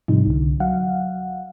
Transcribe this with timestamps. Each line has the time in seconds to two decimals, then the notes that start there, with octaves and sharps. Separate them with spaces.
0.08 G#2 C3 F3 G3 D#4
0.26 C2 D3
0.60 F#3 F5 F#5